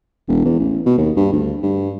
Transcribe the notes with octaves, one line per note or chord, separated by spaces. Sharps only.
E1
E2
A1
B2
D#2
G2
D2
G2